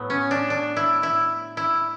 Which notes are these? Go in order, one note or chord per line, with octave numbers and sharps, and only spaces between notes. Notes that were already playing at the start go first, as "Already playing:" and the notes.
Already playing: A2 F#3 A3 B3
C#4
D4
D4
E4
E4
E4